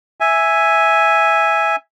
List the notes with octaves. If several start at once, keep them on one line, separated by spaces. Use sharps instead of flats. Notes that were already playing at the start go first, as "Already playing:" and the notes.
E5 G#5